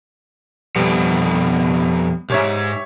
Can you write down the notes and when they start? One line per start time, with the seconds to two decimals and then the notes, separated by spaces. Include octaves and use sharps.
0.76 F2 B2 G3 B3
2.30 C2 G#2 G4 C#5 E5